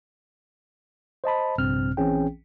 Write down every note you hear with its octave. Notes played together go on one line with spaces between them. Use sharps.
C5 D#5 A5 B5
A#1 G2 C3 C4 F6
A#1 E3 C4 C#4 G#4 G5